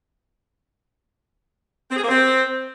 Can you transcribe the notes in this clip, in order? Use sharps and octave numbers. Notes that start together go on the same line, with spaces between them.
C4
G#4
A#3
C4